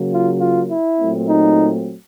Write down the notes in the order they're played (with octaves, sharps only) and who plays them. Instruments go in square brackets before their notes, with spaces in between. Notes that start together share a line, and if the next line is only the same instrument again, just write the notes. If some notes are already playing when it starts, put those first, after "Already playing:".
Already playing: [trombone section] C#3 F#3 A#3
F4
F4
E4
A#2 F#3 A3 C4
D#4